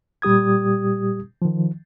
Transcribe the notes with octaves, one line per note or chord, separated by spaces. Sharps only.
A#2 G3 G4 D#6 G#6
D#3 F3